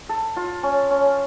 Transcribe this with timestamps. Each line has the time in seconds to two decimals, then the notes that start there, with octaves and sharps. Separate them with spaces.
0.09 A4
0.36 F4
0.63 C#4
0.90 C#4